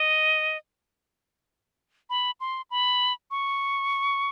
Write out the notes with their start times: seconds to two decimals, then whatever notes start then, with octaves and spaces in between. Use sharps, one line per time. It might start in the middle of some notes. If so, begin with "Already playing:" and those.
Already playing: D#5
2.10 B5
2.40 C6
2.71 B5
3.31 C#6